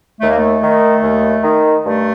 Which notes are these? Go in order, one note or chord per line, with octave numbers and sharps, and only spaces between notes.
D#2 A3
A#3
A3
D#3
D#2
D#3
G2 A3